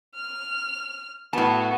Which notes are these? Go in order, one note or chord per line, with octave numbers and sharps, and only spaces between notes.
F6
A2 B3 F#4 A5